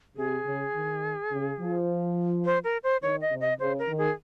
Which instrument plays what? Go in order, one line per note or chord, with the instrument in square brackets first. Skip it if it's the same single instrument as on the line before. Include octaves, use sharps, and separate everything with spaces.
[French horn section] C3 [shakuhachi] G#4
[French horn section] C#3
D#3
C#3
F3
[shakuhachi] C5
A#4
C5
[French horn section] D#3 [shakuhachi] C#5
[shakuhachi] D#5
[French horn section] C3
[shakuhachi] D#5
[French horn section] C#3 [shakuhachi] C5
[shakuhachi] A#4
[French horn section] D#3
[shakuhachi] G#4